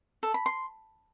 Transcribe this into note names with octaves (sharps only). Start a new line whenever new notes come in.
A4
B5
C6